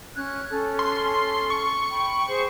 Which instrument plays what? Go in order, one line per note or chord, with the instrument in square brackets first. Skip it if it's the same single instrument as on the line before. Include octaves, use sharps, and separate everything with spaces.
[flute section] C#4 F#6 G#6
C#4 A4
[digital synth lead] C6
C#6
[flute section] G5 B5
G#4 C5